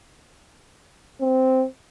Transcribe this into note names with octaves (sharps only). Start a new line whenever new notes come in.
C4